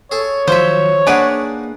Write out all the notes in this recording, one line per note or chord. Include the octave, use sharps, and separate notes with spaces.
G#4 A4 C#5
D#3 F3 F#3 C5 E5
A#3 D4 D#4 G#4 B4 D5 F#5 G#5